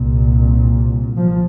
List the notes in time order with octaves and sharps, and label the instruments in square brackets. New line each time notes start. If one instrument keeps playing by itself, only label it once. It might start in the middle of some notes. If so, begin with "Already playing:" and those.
Already playing: [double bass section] C2 A#2
F3